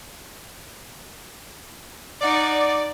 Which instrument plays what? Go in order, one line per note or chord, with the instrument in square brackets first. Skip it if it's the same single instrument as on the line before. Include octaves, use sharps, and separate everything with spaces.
[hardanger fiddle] D#4 F#5 [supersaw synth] D5